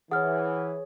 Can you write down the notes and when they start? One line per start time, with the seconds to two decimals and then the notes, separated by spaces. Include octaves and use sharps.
0.11 E3 G#4 C#5 F#5 F6